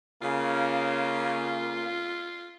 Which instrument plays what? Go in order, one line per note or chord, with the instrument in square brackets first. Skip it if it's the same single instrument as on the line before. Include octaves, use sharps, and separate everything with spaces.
[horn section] C#3 [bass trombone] A#3 [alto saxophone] F4